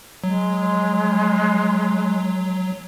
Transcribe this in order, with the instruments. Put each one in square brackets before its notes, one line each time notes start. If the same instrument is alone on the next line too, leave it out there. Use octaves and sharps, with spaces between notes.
[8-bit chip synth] F#3 [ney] G#3